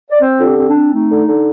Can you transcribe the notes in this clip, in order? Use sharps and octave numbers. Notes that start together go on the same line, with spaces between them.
D5
C4 C5
D3 F4
G4
C4
D4
C4
A3 D#4
D3
D3